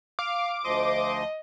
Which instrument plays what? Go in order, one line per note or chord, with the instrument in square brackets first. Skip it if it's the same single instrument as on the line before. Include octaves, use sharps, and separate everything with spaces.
[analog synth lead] F5 [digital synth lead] D6
[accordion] D2 F3 C6 [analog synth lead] D#5